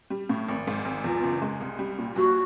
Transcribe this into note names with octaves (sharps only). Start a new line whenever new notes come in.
G3
A2
G#1
G#2
G#1
E2 F4
F#1
G#3
C2
G3
A#2
G2 F#4